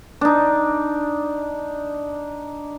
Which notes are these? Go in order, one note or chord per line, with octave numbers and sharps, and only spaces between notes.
D4 D#4